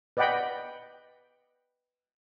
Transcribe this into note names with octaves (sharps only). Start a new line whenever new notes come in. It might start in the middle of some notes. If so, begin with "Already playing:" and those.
B4 D5 D#5 F#5 G5 B5